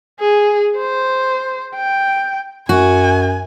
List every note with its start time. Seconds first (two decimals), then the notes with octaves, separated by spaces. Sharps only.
0.20 G#4
0.78 C5
1.76 G5
2.69 F#2 F#4 G#5